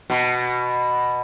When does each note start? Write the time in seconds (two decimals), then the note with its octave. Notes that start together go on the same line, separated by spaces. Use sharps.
0.10 B2